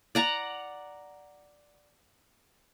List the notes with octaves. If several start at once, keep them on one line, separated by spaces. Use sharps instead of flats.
D5 F#5 A#5